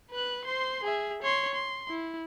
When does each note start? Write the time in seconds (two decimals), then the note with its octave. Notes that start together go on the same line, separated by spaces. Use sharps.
0.11 B4 F#6
0.44 C5 C6
0.84 G#4 E5
1.23 C#5 C6
1.54 C6
1.89 E4